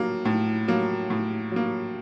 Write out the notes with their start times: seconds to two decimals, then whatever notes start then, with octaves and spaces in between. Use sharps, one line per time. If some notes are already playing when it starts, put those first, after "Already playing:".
Already playing: A2 F#3 A#3
0.25 A2
0.68 F#3 A#3
1.10 A2
1.52 F#3 A#3